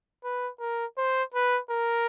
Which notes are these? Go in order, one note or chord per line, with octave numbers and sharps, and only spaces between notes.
B4
A#4
C5
B4
A#4